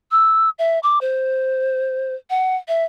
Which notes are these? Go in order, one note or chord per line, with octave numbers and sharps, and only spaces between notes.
E6
E5
D6
C5
F#5
E5